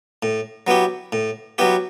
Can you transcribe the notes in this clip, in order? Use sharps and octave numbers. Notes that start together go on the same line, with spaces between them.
A2
F#3 B3 E4 G4
A2
F#3 B3 E4 G4